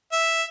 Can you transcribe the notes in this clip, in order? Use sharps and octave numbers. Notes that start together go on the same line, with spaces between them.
E5